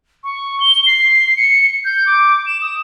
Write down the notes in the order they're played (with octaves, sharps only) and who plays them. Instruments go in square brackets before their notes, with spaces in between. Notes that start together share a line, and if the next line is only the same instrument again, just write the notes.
[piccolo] C#6
G7
C7
C#7
G6
D6
E7
D#6